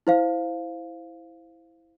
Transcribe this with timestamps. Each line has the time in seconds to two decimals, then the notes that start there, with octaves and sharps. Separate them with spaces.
0.07 E4 C5 F5